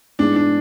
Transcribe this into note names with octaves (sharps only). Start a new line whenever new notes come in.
G#2 G#3 B3 D4 E4 G#4
D4